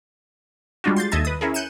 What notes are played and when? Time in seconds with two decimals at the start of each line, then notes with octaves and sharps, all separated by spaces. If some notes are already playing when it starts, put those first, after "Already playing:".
0.84 G3 G#3 D4 F4 F#4
0.96 C6 G6 A6
1.12 D#2 A4 D#5 E5 A5 G#6
1.25 B4 D#6
1.41 C#4 E4 G#4 A#4
1.54 F#6 G6 C#7 D#7 E7